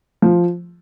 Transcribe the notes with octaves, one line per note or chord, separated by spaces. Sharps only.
F3